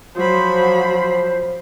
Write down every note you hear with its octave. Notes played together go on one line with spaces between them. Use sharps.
F3 F#3 C5 B5